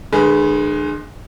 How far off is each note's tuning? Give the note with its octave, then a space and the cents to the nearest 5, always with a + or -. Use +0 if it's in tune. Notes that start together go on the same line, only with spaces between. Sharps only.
D3 +40 G#3 +0 B4 +0